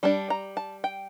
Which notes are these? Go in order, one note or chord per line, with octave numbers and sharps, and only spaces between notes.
G3 D4 A5
A#5
A5
G5